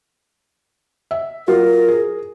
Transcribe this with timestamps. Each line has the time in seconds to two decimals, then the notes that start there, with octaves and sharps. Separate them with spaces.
1.11 E5
1.48 F#3 F4 A#4
1.88 G#4